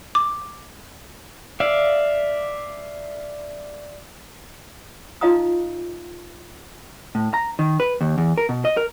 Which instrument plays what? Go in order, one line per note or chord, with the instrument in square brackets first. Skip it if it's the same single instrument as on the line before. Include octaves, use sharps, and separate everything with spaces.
[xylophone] D6
[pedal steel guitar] D5 E5 F5
[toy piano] D#4 F4 D#5 F5 A#5 D#6
[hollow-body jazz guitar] A2
A#5
D#3
B4
D#2
E2
A#4
B2
D#5
A#4